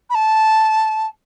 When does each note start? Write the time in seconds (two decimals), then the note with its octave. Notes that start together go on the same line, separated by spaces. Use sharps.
0.10 B5
0.15 A5